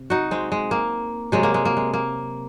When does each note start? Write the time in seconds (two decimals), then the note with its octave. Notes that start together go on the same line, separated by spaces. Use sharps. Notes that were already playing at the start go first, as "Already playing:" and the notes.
Already playing: C3
0.10 D#4 F#4
0.31 G#3 C4
0.52 G#3
0.71 A#3
1.32 C3 F#3 G#3
1.43 A#3
1.54 G#3
1.65 A#3
1.77 G#3
1.93 A#3